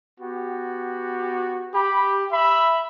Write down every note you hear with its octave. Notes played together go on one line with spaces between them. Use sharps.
B3 F#4 G4
G4 B5
E5 B5